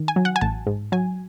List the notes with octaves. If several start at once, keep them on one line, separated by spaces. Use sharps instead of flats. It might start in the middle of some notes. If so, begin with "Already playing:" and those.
Already playing: D#3
G#5
F#3
F#5
G#5
A1 A5
G#2
F#3 G#5